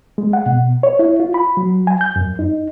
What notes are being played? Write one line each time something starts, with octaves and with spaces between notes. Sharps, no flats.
G#3
F#5
B2
C#5
E4
F4
B5
F#3
G#5
G6
F#2
D#4